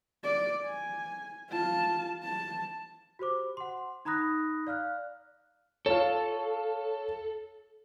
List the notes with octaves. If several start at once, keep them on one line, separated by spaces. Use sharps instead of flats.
D5
G#5
F4 A5
A5
F#4 G4 C5 D6
F#5 C6
D#4 A#5 B5 D#6 F#6 A#6
D5 F5 F6 F#6
F4 A4 C#5